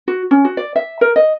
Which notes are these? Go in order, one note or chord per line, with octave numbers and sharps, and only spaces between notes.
F#4
C#4
F#4
D5
E5
A#4
D#5